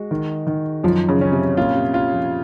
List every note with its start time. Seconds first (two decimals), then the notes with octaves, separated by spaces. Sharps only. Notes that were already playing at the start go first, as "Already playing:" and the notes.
Already playing: G#3 F#4
0.11 D#3
0.47 D#3
0.84 F#2 F3
1.09 C#3
1.21 C#4
1.32 C3
1.57 A#2 F4
1.75 C3
1.94 F4
2.13 F3